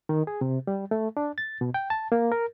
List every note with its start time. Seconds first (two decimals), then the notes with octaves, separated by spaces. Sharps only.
0.09 D#3
0.27 G#4
0.41 C3
0.67 G3
0.91 A3
1.17 D4
1.38 A6
1.61 B2
1.74 G5
1.90 A5
2.12 A#3
2.32 A#4